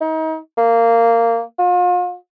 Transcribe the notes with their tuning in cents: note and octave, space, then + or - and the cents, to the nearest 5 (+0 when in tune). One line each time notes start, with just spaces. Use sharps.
D#4 +35
A#3 -15
F4 +40